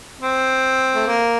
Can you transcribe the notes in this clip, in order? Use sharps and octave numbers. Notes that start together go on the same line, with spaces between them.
C4
A3
A#3